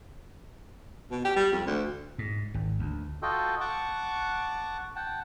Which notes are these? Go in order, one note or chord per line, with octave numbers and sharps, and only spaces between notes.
B2
G4
G3
F2
D2
G#2
G#1
D2
F4 F#4 A4 D#5 G5
F#5 A5 C#6 D6
F#5 G5 A5